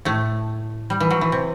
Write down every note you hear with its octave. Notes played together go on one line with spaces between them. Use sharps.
A2 A3
G3
E3
F#3
E3
C3